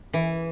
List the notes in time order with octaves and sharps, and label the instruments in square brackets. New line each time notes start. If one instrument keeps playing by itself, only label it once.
[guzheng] E3